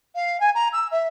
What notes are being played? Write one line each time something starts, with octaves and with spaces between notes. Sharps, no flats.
F5
G#5
A#5
E6
E5